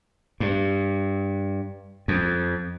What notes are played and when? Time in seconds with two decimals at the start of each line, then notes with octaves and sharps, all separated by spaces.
0.40 G2
2.08 F2